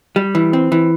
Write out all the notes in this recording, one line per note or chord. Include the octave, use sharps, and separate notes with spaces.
G3
E3
C4
E3